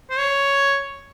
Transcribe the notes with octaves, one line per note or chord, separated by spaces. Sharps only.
C5
C#5